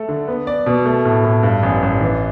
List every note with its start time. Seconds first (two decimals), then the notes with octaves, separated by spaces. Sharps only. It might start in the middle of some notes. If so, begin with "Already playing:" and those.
Already playing: A3 A4
0.09 D3
0.28 B3
0.47 D5
0.66 B2
0.86 A3
1.05 A2
1.24 A2
1.43 G2
1.63 A1
1.82 A1
2.01 E3